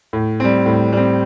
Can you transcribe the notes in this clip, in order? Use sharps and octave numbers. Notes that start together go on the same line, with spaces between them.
A2
G3 C4
A2
G3 C4